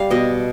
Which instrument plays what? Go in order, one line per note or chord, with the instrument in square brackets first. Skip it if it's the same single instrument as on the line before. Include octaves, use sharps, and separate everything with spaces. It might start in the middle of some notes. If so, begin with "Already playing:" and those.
Already playing: [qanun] G3 F5
B2 D#5